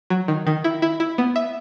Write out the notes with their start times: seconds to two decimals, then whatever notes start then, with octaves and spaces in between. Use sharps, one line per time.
0.10 F#3
0.28 D#3
0.47 D#3
0.64 E4
0.82 E4
1.00 E4
1.18 B3
1.36 E5